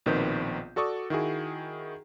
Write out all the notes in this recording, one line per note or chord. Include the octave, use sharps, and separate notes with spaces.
A#1 B2 D#3 B3 C4 G6
F#4 A4 D5 C#6 D#6
D#3 E4 F#4 G#4